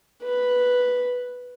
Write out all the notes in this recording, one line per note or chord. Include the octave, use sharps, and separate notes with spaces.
B4